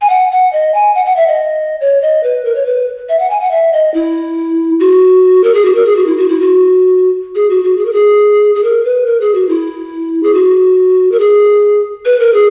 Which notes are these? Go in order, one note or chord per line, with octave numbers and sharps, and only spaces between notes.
G#5
F#5
F#5
D#5
G#5
F#5
F#5
E5
D#5
C#5
D#5
B4
A#4
C#5
B4
E5
F#5
G#5
F#5
E5
D#5
E4
F#4
A#4
G#4
F#4
A#4
G#4
F#4
E4
F#4
E4
F#4
G#4
F#4
F#4
G#4
A#4
G#4
G#4
A#4
B4
A#4
G#4
F#4
E4
G#4
F#4
A#4
G#4
B4
A#4
G#4